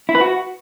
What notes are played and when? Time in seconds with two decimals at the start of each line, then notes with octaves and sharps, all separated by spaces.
0.09 E4
0.15 B4
0.21 F#4